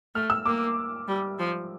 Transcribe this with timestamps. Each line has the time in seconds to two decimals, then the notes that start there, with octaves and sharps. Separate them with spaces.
0.15 A3 F6
0.30 E6
0.46 A#3 D6
1.08 G3
1.39 F3